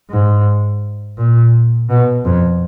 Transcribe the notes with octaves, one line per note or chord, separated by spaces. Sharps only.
G#2
A#2
B2
F2